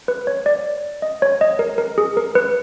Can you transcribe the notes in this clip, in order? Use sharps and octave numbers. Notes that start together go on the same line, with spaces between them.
B4
C#5
D5
D#5
C#5
D#5
A#4
A#4
G#4
A#4
B4